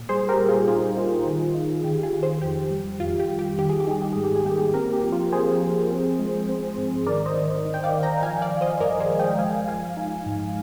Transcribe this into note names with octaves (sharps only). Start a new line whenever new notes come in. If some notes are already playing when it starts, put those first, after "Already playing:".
Already playing: A#2
G3 G#4 C5
G4 A#4
G3
F4 G#4
D#4 F4 G#4
D#4
D#3
D#4
D#3 G4
F4 G#4
D#3
G#4 C5
F2 G4
G3
F2 F4
G4
G3
G4
D#3 G4
G#4
G4
D#4 G#4
G4
G#2 G#4
G4
G#4
A#3 G4
C4 G4 A#4
G4
F3
F4
F3 G#4 C5
F3
C4
G#3
C4
G#2
D#3 A#4 D5
C5 D#5
D#3
D#3
G5
D5 F5
D#3
G5 A#5
F3 F5 G#5
D5 F5
F3
C5 D#5
G2 A#4 D5
G#4 C5
G#3
D#5 G5
F3 F5 G#5
F3 F5 G#5
D#4
G#2